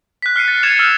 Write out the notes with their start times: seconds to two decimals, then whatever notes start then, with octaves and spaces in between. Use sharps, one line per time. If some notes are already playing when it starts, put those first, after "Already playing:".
0.22 F#6 B6
0.36 F6 C7 C#7 D#7
0.48 A6 C#7
0.63 F#6 G#6 A6 C#7 E7 F7
0.79 E6 F6